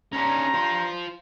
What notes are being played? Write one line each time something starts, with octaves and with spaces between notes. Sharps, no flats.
G2 C#4 D#4 A#5
F4 C5